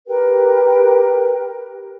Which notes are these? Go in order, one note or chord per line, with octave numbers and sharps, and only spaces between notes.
G4 A#4 B4 G5